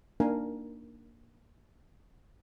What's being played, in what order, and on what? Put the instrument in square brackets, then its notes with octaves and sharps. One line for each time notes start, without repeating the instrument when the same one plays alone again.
[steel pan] A#3 D4 D#4 A#4 F5 G#5